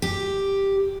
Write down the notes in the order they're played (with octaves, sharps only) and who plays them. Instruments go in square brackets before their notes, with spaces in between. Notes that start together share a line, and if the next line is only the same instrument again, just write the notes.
[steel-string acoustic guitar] G4